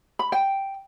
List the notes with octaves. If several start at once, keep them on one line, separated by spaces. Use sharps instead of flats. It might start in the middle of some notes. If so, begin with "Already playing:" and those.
B5
G5